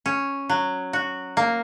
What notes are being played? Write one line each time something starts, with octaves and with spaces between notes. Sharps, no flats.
C#4
F#3
F#4
A#3